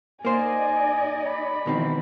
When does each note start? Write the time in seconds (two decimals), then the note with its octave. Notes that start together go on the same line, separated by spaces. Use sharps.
0.25 A#3 D#4 C5 D5 D#5 G#5
1.29 B5
1.66 B2 D#3 E3 G#3 C4